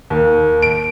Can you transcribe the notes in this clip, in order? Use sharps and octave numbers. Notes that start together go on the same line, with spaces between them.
D#2
D7